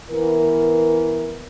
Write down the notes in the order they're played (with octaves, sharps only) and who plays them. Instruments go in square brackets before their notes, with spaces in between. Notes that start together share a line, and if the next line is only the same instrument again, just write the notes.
[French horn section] E3 B3 A#4